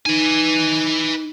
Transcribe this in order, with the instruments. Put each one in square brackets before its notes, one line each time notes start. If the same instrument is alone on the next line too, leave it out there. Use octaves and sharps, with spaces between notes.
[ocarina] D#4 [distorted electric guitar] B4 G#5